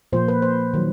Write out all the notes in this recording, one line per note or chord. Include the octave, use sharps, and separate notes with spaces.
A#2 F3 A#3 C5
B4
C5
D#3 F#3